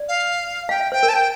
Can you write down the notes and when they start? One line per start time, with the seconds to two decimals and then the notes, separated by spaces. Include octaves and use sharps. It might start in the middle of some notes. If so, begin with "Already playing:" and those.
Already playing: D5
0.08 F5
0.69 F5 G5
0.80 E5
0.92 C5 G5
1.03 A#4
1.09 A5
1.14 G5